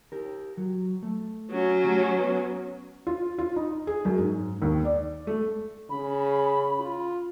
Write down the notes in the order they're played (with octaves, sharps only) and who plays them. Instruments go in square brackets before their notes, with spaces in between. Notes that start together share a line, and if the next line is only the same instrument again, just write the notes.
[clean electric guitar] G4 A#4
F#3
A3
[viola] F#3 C#4
[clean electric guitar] A3 G4
B3 B4
[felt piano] F4
F4
D#4
G#4
F#2
G#2
D#2
D5
A3
[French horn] C#3 [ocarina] B5
[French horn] F4